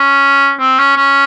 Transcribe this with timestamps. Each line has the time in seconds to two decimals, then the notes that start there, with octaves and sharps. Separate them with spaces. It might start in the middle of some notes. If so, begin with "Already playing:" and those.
Already playing: C#4
0.60 C4
0.79 C#4
0.96 C#4